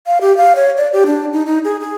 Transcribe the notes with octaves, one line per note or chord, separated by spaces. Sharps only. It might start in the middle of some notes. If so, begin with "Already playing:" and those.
F5
G4
F5
C#5
D5
G4
D4
D#4
D#4
G#4
G#4